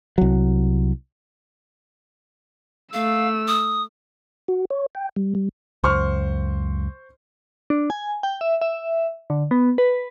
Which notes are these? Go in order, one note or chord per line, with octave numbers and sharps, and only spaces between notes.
C2 F#3
A3 F5 E6
D#6
F#4
C#5
G5
G3
G3
C#2 F#2 C5 C#6 F6
D4
G#5
G5
E5
E5
D3
B3
B4